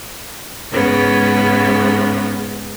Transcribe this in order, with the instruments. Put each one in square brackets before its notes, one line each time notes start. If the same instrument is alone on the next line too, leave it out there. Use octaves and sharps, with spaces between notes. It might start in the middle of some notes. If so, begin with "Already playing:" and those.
[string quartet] G#2 C#3 B3